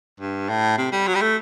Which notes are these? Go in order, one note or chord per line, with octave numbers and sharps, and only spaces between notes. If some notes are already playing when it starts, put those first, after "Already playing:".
G2
A2
C3
G3
F#3
G3
A3